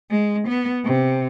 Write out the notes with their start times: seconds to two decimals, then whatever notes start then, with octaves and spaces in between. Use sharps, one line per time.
0.10 G#3
0.48 B3
0.85 C3